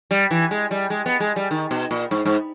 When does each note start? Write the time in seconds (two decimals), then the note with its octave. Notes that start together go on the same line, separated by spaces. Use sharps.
0.11 G3
0.31 E3
0.51 G#3
0.71 G3
0.90 G#3
1.06 B3
1.20 G#3
1.36 G3
1.51 D#3
1.71 B2
1.91 A#2
2.11 G#2
2.26 G#2